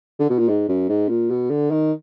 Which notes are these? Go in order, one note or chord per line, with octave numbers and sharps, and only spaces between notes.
D3
B2
A#2
G#2
F#2
G#2
A#2
B2
D3
D#3